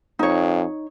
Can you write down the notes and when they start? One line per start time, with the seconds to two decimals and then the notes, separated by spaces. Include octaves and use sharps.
0.19 F2 D#4 C#5